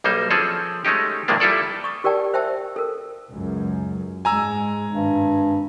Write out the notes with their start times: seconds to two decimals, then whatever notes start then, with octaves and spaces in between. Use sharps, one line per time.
0.04 B1 G3 A#3 D#4 C5
0.30 F3 C4 C#4 G#4 A4
0.85 G#3 A3 C#4 D#4 G4
1.28 A#1 G2 D#3 G#3 A#3 D4
1.40 G3 E4 F4 A4 D5
1.84 C#6 D#6
2.04 G4 A#4 D5 G5 A5
2.34 C5 E5 G5 A5 E6
2.76 A4 A#4
3.30 C#2 F#2
4.25 G#2 G#3 G#5 A#5 E6
4.91 G#1 G2